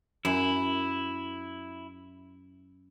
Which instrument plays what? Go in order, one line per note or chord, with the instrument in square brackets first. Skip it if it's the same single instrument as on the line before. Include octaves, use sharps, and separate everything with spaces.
[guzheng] F#2 G#5 [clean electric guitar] E4